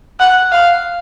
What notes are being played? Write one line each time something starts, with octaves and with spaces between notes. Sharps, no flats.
F#5
F5